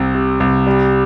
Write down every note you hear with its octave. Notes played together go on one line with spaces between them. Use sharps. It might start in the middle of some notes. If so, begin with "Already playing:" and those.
Already playing: C2 C3
C3
C2
G3